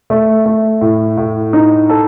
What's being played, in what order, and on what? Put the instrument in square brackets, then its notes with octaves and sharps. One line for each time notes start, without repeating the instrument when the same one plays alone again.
[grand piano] A3
A3
A2
A2
D#4
A4